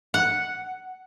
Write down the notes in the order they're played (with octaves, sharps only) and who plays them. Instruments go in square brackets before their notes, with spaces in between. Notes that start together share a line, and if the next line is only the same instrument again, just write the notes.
[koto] F#5